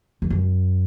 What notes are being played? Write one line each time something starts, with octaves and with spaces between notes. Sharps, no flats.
E2
F#2